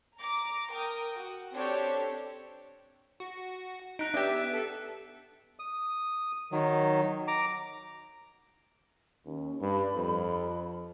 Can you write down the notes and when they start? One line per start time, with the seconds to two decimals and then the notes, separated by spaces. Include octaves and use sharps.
0.18 A#5 D6
0.71 A#4 G5 D#6
1.15 F#4
1.54 C4 D4 G4 A4 C#5
3.20 F#4
3.99 D#4 A#5 F#6 B6 D7
4.14 B3 D4 G4 E5
4.52 A4
5.59 D#6
6.52 D#3 F#3
7.28 A#5 D6
9.26 D#2 C#4
9.61 G2 B5
9.95 F2